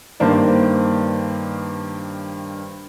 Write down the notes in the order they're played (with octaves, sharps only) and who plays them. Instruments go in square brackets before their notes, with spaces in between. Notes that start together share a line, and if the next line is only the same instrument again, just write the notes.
[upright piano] G2 D#3 A#3 C5 D5